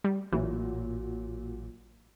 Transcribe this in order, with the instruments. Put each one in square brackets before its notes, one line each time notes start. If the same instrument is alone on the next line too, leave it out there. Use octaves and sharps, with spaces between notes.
[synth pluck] G3
[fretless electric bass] A1 [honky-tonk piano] A#2 F#3 [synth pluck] E3